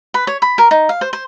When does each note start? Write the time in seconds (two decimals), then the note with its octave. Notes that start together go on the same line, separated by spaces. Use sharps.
0.14 B4
0.27 C#5
0.42 B5
0.58 A#4
0.71 D#4
0.89 F5
1.01 C5
1.13 C5